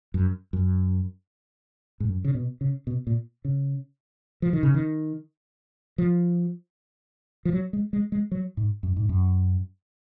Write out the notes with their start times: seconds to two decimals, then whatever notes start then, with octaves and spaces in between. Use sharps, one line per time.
0.14 F#2
0.53 F#2
2.00 G#2
2.09 F#2
2.25 C#3
2.35 B2
2.61 C#3
2.87 B2
3.07 A#2
3.45 C#3
4.42 F3
4.53 D#3
4.63 C#3
4.74 D#3
5.98 F3
7.45 F3
7.53 F#3
7.73 G#3
7.93 G#3
8.12 G#3
8.32 F#3
8.57 G#2
8.83 F#2
8.97 G#2
9.09 F#2